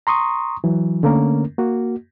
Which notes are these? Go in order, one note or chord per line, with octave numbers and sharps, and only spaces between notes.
A#5 C6 C#6 D#6
E3 F#3
D3 A3 A#3 C#4 A#4
A#3 F#4